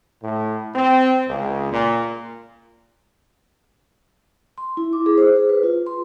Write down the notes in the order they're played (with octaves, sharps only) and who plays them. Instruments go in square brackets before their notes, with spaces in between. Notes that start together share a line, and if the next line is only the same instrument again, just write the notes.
[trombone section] A2
C4
C#2
A#2
[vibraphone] C6
E4
D6
G#4
C5
G#4
B4
F4
C6